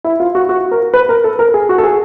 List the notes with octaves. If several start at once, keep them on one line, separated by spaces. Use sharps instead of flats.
E4
F4
F#4
F#4
A#4
B4
A#4
A4
A#4
G#4
F#4
A4
G#4